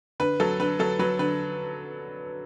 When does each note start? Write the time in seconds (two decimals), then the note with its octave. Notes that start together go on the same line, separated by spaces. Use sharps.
0.20 D3 B4
0.40 F#3 A4
0.60 D3 B4
0.79 F#3 A4
0.99 F#3 B4
1.19 D3 B4